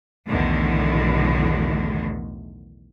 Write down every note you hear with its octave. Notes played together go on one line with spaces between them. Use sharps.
B1 E2 A2 D3 D#3